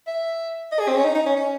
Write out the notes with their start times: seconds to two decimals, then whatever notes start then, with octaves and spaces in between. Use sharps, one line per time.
0.07 E5
0.72 D#5
0.79 G#4
0.88 C4
0.96 C#4
1.04 D#4
1.15 D#4
1.26 C#4
1.36 C#4